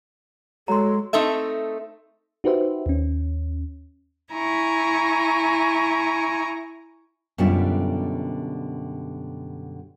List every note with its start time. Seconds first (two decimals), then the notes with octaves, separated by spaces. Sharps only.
0.68 F#3 G#3 A4 A#5 C6
1.13 A3 C4 D#4 A4 E5
2.44 D#4 F#4 G4 B4 C5 E5
2.86 D#2 C#4
4.32 E4 G#5 A#5 C#6
7.38 F#2 B2 D3 G3 F4 E5